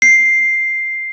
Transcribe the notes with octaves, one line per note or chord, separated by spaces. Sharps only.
C7